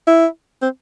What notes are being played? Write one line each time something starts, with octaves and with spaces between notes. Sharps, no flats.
E4
C4